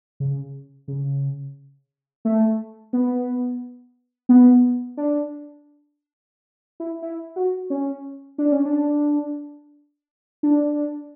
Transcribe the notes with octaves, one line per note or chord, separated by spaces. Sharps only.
C#3
C#3
A3
B3
B3
D4
E4
E4
F#4
C#4
D4
C#4
D4
D4